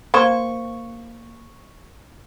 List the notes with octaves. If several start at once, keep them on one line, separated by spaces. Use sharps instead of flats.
A#3 C5 C#6